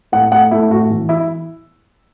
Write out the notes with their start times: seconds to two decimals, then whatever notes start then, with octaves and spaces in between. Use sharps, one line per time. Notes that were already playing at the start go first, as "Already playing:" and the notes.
0.12 A2 F#5
0.31 A3 F#5
0.51 A3 E4
0.70 A2 F#4
0.90 E3
1.09 E4